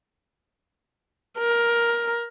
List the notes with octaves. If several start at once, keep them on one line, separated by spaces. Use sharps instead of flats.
A#4